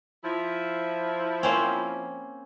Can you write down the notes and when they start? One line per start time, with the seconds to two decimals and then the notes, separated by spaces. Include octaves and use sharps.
0.23 F3 E4
1.43 A#3 C4 C#4